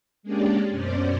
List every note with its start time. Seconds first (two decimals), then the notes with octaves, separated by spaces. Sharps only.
0.23 G#3 A#3 C#4 D4 G4 D5
0.70 F#2 B2 C#4 C5 D5